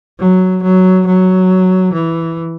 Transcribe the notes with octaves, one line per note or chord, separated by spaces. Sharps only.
F#3
F#3
F#3
E3